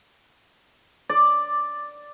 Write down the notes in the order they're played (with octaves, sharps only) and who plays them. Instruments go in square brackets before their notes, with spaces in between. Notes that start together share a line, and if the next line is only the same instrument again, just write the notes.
[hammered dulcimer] D5